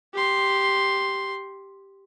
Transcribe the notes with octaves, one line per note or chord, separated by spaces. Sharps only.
G4 C6